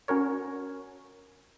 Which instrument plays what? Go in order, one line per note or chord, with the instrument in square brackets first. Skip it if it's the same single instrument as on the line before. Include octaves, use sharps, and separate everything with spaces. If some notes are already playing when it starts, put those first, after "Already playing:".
[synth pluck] C#4 F#4 A#4 C#5